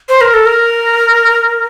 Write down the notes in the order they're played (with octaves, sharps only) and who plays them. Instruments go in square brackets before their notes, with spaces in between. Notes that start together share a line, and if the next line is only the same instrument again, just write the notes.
[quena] C5
A#4
A4
A#4